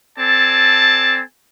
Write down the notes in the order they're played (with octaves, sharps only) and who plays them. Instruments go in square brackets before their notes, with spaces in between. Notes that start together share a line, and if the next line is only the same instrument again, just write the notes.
[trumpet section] C4 A4 D5 G#5 A5